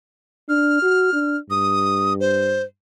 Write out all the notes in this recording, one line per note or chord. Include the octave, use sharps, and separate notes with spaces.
D4 F6
F#4
D4
G2 D#6
C5